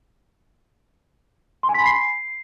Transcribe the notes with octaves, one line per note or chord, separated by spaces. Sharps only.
C6
G#5
B6
B5
C7